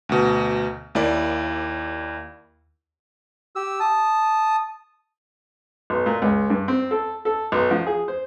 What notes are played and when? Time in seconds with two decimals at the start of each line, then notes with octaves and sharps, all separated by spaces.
0.09 D2 B2
0.95 D#2 A#3 E4 D5
3.56 G4 E6
3.80 A5 D#6
5.90 B1
6.06 A#2
6.22 C#2
6.50 G2
6.68 C4
6.91 A4
7.25 A4
7.52 B1
7.71 F3
7.87 G#4
8.08 C5